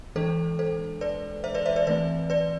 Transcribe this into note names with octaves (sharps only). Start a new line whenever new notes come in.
E3 G#3 D4 A4 C5
A4 C5
B4 D5
C5 E5
B4 D5
C5 E5
B4 D5
E3 A3 C4 B4 D5
B4 D5